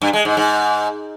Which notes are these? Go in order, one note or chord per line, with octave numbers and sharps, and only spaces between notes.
G2
G#3
G#2
G#2